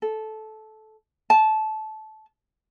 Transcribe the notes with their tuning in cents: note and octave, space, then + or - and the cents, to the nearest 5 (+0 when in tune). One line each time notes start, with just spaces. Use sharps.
A4 -15
A5 -20